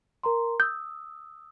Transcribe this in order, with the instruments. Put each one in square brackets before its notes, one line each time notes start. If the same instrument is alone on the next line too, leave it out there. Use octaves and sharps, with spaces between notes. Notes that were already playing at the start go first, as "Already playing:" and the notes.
[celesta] A#4 A#5 C6
[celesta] D#6 E6 [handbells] G6